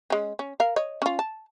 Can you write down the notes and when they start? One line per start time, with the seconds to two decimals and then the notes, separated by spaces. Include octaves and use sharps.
0.10 G#3 C#4
0.39 C#4
0.60 A#4 F5
0.76 C#5 D#5
1.02 C#4 F4
1.19 A5